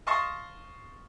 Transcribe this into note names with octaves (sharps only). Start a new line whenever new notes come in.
D#5 F5 A5 C6 C#6 D#6